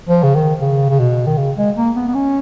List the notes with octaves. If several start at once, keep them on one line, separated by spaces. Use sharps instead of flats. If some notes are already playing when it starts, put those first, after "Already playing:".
F3
C#3
D#3
C#3
C#3
B2
D#3
C#3
G#3
A#3
B3
B3
C#4